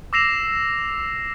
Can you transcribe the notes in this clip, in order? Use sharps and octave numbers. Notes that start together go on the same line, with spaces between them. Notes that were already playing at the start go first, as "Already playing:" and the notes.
D6 E6 A#6 C7 E7 F7